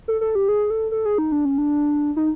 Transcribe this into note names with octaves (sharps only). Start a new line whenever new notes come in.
A4
A4
G4
G#4
A4
A4
G#4
D#4
D4
C#4
D4
D#4